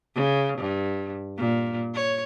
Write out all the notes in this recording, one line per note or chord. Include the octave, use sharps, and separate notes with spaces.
C#3
G2
A#2
C#5